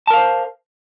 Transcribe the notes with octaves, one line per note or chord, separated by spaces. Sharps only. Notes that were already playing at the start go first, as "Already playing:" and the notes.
A#4 C5 F5 A5